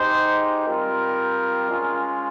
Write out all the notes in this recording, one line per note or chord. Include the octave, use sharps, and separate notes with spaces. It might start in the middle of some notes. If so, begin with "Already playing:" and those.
Already playing: G#3 D#4 G4 C5
G3 C4 F4 A#4
G#3 C#4 F4